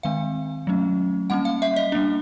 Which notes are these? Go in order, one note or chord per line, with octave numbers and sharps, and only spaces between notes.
D#3 G#3 C4 F5
F#3 A3 C#4
G3 A#3 C#4 F#5
F5
E5
D#5
G3 A#3 D4